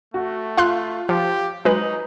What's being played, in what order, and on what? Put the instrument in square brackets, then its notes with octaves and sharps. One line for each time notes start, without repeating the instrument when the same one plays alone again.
[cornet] A3 [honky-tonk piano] F#4
[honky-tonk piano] F4 [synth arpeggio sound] F5 C6 F#6
[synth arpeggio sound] F3 [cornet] G4
[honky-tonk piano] F#3 F#7 [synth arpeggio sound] G#3 B4 [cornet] D#4